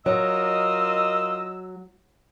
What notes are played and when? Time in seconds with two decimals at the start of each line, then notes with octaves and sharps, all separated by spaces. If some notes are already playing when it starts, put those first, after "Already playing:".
0.06 F#3 F4 A#4 D#5 E6